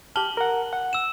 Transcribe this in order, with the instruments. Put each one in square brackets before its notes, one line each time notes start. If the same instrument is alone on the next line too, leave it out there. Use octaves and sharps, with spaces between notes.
[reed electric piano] G4 F6 [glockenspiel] A5 F#7 G7
[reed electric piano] A#4 F#5
F#5
[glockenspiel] E6 E7